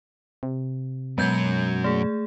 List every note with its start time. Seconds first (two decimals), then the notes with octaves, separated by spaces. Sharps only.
0.43 C3
1.18 F#2 B2 F#3 G#3 G6 G#6
1.84 A3 G#4